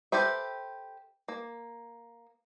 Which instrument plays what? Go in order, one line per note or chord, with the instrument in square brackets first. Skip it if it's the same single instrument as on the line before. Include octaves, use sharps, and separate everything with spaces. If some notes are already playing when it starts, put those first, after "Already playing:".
[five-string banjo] G4 A4 B4 C5 E5
A#3